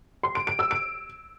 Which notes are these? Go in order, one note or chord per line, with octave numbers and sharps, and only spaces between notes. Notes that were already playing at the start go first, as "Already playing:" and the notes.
C6
D7
D7
E6
D7